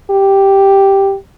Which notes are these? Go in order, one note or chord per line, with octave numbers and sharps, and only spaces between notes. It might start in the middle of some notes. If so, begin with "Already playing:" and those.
G4